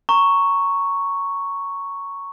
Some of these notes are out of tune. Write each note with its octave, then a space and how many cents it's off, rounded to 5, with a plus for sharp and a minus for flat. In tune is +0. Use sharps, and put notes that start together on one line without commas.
A#5 -15 C#6 +0